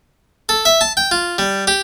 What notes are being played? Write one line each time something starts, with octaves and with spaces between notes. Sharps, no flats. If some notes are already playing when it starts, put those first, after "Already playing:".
A4
E5
A5
G5
F4
G3
G4